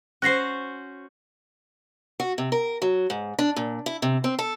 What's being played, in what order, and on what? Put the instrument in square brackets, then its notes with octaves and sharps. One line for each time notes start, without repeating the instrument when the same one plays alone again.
[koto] C#4 F#4 C5 [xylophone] F#6 A#6 C7
[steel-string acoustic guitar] F#4
C3
A#4
F#3
G#2
D4
A#2
E4
C3
C4
A4